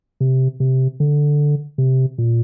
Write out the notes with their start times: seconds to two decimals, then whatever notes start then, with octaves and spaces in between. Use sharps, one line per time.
0.21 C3
0.60 C3
1.00 D3
1.78 C3
2.18 A#2